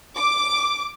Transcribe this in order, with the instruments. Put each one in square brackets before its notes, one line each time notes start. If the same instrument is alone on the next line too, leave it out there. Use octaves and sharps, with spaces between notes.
[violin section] D6